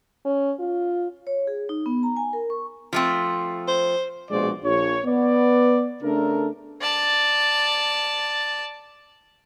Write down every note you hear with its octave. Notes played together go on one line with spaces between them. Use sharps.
C#4
F4
C#5
G#4
D#4
B3
A#5
G#5
A#4
C#6
F3 A3 C4
C5
A#1 B2 G#3 F#4 C5 D5
A#1 C#5
B3 D5
C#3 A3 D4 A4 A#4
D5 A5